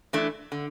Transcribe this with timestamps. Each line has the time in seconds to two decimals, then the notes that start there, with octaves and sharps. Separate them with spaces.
0.13 E3 A3 D4
0.52 D3